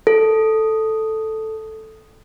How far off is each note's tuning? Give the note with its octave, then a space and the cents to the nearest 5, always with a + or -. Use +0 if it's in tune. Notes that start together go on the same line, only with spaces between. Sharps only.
A4 +0